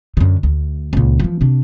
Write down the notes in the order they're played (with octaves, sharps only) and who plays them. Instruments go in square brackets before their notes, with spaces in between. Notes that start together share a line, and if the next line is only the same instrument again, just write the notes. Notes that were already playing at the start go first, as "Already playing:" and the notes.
[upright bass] F#2 D3
D2
C#2 A#2
E3 F3
C3 D4